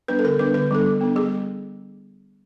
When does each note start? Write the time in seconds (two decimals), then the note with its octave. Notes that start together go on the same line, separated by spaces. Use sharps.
0.08 G3 B3 D4 B4
0.19 A4
0.24 D3 A#4
0.39 G3 B3 D4 B4
0.54 D3 B4
0.71 G3 B3 D4 A4
0.86 G3
1.01 B3 D4
1.16 G3 G#4